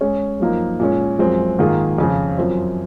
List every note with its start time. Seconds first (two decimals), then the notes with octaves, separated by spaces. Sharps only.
0.01 G#3 C#4 G#4 C#5
0.40 F#2 F3 A#3 D#4
0.80 A#2 G#3 C#4
1.19 F#2 F3 G#3 C4
1.59 G#2 D#3 A#3 F4 G#4
1.98 F2 C#3 F3
2.38 F#2 F3 C4